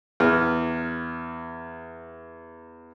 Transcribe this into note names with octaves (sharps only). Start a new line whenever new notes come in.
E2 F6